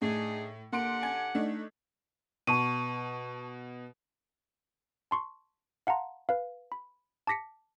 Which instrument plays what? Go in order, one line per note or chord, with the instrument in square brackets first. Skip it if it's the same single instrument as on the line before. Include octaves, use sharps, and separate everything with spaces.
[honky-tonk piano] A2 [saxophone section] D4 D#4 G#4
[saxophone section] D3 G4 F#5 [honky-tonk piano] A#3 C6 D7
[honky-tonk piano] G#5 G#6
A3 D4 D#4
[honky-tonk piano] B2 [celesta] A5 C#6 D#7
[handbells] A5 C6 C#6
F5 F#5 A5 A#5 C6
B4 F5
B5
A5 D6 A#6 B6 C#7